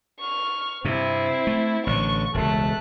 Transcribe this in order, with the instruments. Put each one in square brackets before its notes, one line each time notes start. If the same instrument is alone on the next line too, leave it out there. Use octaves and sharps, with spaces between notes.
[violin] C#6 F6
[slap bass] G2 C3 [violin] C4 E4
[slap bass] A3
[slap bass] A1 D3 [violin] C#6
[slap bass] E1 C#2 [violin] A3 F#6